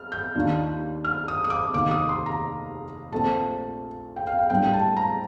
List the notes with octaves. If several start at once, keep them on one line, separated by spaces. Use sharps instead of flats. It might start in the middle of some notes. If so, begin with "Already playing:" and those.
Already playing: F6
G6
D#2 D#3 A#3 D4 F4
F6
D#6
D#6
D6
F1 D#2 D#3 A#3 D6
D#6
C6
A#5
A#1 A#2 A3 C4 A5
G5
F5
G5
A2 G3 A#3 D4 G5
A5
A#5